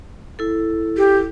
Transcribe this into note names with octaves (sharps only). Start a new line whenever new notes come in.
E4 A4
G4